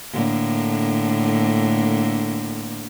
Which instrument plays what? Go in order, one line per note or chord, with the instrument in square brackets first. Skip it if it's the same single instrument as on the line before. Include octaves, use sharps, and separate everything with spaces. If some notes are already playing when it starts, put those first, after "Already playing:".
[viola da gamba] A2 D3 A#3